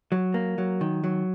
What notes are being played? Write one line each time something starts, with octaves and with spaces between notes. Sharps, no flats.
F#3
A#3
F#3
D#3
F#3